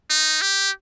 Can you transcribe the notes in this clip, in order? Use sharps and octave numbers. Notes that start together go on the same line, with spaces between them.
D#4
G4